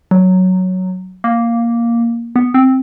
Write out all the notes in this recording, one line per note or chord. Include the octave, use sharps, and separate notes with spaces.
F#3
A#3
B3
C4